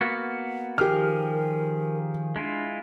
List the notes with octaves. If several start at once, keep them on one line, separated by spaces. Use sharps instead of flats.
A#3 B3 F#4
D#3 F3 G4 G#4 A#4 F6
G#3 D4 E4 F4